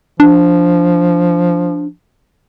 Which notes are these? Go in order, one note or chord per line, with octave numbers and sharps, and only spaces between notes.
F3 D4